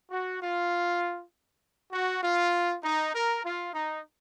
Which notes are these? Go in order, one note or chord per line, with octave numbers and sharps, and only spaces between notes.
F#4
F4
F#4
F4
D#4
A#4
F4
D#4